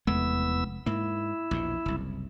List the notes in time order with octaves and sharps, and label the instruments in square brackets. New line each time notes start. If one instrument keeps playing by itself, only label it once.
[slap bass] F1 G#3 A3 [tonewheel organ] E2 B3 E6
[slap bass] G#2 A#3 [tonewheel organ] E4
[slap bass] A#1 E2 B2
F#1 C2